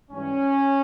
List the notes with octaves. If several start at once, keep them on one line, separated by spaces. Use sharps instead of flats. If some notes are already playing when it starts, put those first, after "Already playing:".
G#2 E3 G3 C#4